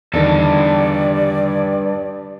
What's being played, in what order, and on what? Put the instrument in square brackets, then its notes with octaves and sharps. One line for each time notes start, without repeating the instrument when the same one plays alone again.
[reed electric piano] E2 D3 D#3 [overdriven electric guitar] G2 A4 [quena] D5